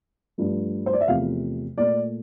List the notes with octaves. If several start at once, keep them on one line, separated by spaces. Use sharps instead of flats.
G2 F3 A3
C5
D5
E5
E2 C3 F3 A3 F5
A#2 A3 D5